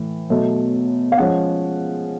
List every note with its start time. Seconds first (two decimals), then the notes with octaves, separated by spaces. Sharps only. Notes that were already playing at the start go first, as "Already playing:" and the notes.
Already playing: A2 E3
0.30 B2 F#3 A3
1.12 F5
1.17 F3 G#3 C#4 F#5